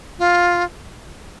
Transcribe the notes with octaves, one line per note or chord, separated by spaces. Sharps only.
F4